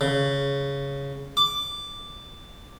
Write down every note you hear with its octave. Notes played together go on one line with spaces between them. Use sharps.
C#3
D6